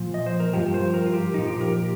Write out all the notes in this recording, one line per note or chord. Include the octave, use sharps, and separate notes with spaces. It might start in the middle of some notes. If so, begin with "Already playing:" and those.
Already playing: A#2 F3
D#5
C5
A#4
G2 F3 G4
C5
A#4
F4
G4
A#2 F3 D#4
G4
A#4
G4